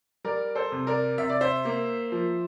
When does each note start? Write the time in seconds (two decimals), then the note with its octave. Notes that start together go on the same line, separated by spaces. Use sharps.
0.24 G3 A#4 D5
0.55 A4 C5
0.72 C3
0.87 A#4 D5
1.18 C3 E5
1.29 D5
1.41 C5 E5
1.65 A#3
2.12 F3